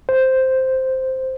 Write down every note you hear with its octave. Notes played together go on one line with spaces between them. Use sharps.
C5